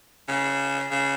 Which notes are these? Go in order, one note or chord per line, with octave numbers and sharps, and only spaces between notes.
C#3
C#3